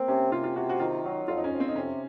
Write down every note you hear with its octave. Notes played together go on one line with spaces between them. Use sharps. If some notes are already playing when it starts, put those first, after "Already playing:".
Already playing: A#3 C4
C3 C#4
C3 F4
F4
C3 F#4
F#4
D#3 F4
F#3 D#4
F2 F4
D#4
C#4
F2
C4
D#4
C3 C#4